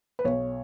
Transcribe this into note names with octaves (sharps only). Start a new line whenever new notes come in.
B4
B1 C#5